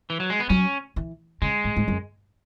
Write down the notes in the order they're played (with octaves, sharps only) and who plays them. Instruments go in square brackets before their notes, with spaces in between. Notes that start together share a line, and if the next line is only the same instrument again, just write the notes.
[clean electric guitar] E3
F#3
G#3
B3
[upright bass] F#3 [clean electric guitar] C#4
[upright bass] E3
[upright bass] C#3 [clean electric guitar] G#3
[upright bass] G#2
G#2
F#2